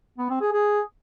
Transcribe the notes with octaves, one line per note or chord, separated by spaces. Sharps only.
B3
C4
G#4
G#4